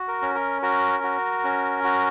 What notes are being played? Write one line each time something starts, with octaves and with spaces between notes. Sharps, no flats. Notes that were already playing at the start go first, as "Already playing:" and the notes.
Already playing: F#4
A#4
C#4
A#4
F#4 A#4
F#4
C#4
F#4